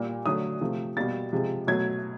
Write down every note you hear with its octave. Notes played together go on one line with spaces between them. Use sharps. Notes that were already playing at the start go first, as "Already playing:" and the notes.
Already playing: A#2 G3 A#3
D3 F#3 A3 D#6
C3 F3 A3
B2 G3 A#3 A6
C3 F3 G#3
B2 F#3 A3 G#6